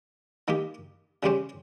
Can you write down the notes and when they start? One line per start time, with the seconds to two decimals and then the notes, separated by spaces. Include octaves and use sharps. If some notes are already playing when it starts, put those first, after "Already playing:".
0.48 D#3 A#3 D#4 G4
1.23 C#3 G3 C#4 G4 C5